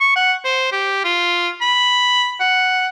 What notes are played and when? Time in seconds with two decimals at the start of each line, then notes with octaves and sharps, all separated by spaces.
0.01 C#6
0.16 F#5
0.45 C5
0.72 G4
1.04 F4
1.62 B5
2.40 F#5